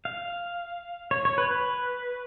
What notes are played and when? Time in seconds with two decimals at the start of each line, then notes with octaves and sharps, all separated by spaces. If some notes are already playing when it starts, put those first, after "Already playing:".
0.05 F5
1.11 C#5
1.25 C#5
1.38 B4
1.51 B4